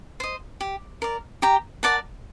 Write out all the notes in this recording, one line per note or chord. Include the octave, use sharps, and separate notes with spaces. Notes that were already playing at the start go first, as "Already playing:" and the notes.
C5 D#5
G4
A#4 D5
G4 G5 A#5
A#4 D5 F#5 A5